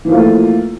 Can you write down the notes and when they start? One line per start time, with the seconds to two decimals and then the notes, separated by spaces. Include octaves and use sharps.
0.05 E3
0.08 F3
0.11 A#3
0.15 A3
0.18 F4